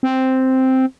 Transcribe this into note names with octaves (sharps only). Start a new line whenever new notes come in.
C4